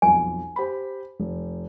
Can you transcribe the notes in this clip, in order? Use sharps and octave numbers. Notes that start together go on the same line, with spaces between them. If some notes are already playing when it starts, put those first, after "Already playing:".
B1 F2 G#5
G4 C5 B5
F1